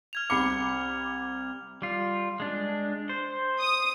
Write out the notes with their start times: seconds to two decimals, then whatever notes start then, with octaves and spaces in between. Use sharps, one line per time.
0.13 F6 G#6 F7
0.30 C2 B5 D6 C#7
1.82 G3 F4
2.40 G#3 D4
3.09 C5
3.59 D#6